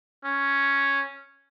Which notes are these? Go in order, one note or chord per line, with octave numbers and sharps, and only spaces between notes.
C#4